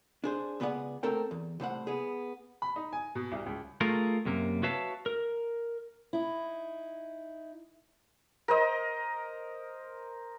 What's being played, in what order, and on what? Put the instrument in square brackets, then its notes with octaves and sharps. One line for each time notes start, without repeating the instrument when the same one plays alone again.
[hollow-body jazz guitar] D4 G#4 C5
C#2 B3 G#4 D5 F#5
A3 C4 A4 A#4 G5
E2
C2 A2 C5 F#5
B3 G#4
[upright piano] B5
D#4
G#5
B2
C2
C#2
[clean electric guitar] A3 F4 G#4 A#4
F#2 C3 A#3
F#4 B4 C#5 E5 F5 A5
A#4
[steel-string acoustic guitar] D#4 E4
[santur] A#4 C5 D#5